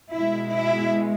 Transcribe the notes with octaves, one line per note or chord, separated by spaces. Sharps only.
B2 G#3 E4
E4